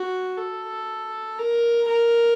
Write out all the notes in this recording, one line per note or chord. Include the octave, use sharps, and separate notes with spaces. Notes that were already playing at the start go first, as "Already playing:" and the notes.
Already playing: F#4
A4
A#4
A#4